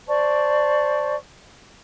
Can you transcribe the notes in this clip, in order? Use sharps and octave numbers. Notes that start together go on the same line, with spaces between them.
C5 D5 A5 C#6